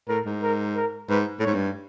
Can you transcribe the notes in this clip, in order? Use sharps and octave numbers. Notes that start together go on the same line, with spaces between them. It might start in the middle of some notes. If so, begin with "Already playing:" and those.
A2 A#4
G#2
A#4
A#4
G#2 B4
A2
G#2 C#5
G2